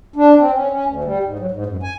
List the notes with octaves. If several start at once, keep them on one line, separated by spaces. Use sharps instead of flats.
D4
C4
C#4
C#4
D2
G3
G#2
F#3
G#2
F#2
G#5